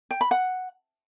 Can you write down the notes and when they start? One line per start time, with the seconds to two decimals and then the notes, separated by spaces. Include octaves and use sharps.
0.11 G5
0.21 B5
0.31 F#5